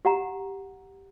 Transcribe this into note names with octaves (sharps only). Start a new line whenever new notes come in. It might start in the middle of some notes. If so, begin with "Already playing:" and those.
G4 F#5 A#5